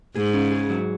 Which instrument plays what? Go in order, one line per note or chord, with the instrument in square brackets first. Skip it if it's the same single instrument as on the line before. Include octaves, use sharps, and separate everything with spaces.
[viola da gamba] G#2 [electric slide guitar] G#4
[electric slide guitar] C#4
G#4
F#3